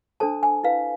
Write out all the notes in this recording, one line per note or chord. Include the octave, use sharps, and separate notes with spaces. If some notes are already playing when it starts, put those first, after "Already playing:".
D4 A4 C5 A5
G#5
E4 B4 F5